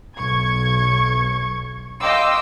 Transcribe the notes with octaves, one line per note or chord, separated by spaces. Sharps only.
B1 C#6 G#6
D#5 F5 G5 C6 D6 E6